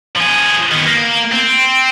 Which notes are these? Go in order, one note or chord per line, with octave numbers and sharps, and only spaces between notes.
F3 G#4
D#3 B3
A#3
C4